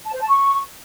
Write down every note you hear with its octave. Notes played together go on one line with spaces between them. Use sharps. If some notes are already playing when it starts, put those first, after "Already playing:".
A5
C5
A5
C#6